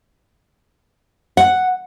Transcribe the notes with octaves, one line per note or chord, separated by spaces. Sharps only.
F#5